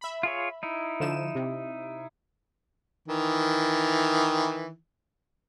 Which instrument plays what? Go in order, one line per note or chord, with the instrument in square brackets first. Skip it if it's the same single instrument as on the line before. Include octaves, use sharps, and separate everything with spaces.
[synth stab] E5 B5
[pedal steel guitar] F4 G#4 C#5
D#4 E4
[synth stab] D3 F3 E7
C3
[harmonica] D#3 E3